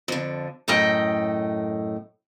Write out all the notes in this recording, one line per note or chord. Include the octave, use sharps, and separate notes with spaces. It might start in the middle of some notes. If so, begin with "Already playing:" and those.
F2 D3
F#2 A2 A4 D#5 G5